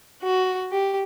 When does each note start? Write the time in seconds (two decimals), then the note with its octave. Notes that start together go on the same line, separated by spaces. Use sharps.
0.23 F#4
0.71 G4